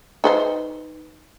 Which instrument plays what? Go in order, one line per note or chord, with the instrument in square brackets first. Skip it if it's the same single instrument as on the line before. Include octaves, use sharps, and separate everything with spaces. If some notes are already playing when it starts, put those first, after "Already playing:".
[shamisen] D#4 B4 C5